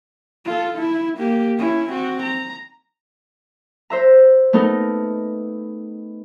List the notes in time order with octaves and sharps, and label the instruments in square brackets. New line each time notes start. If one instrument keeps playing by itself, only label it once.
[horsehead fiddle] F4 A4
E4
A#3 G4
C#4 E4
C4 F#4
A#5
[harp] C5 E5 A#5
A3 B3 D#4 A4 A#4